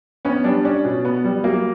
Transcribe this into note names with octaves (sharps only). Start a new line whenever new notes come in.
B3 C#4
G3 D4
C#4 D4
B2
B3
G3
F#3 A#3